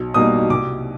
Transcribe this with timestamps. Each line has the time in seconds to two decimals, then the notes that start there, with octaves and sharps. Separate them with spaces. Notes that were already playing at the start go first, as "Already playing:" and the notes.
Already playing: B1
0.14 B2 G3 A#3 D#4 D#6
0.50 C2 D6